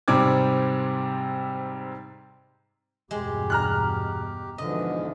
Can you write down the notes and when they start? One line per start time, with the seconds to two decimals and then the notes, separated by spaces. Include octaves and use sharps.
0.08 G#2 C3 G3 C4 D6 G#6
3.11 E2 G2 B2 G#3 G4
3.50 A#5 F6 F#6
4.58 G#2 B2 D3 E3 F3 D#5